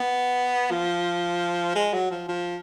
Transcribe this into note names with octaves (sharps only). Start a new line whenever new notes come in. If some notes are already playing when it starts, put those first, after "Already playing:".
Already playing: B3
F3
G#3
F#3
F3
F3